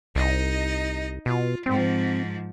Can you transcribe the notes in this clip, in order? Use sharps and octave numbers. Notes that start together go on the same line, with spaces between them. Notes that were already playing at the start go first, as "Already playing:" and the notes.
C2 D#4 D#5
B2 F4
G#2 F3 C4